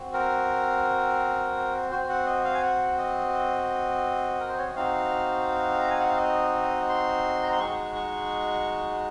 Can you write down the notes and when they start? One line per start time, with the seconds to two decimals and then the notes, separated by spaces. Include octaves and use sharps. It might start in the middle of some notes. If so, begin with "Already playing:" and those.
Already playing: C4 F#4
0.14 A#4
1.91 C4 F#4 C5
2.10 F#5
2.27 D#5
2.45 F5
2.54 G#5
2.63 F#5
2.98 D#5
4.40 A#4
4.49 C5
4.58 C#5
4.67 D#5
4.75 C4 D#4 F#4 F5
5.81 A#5
5.90 G#5
6.00 F#5
6.09 F5
6.18 D#5
6.89 C6
7.43 A#5
7.52 C6
7.60 G#3 D#4 F#4 C#6
7.95 C#6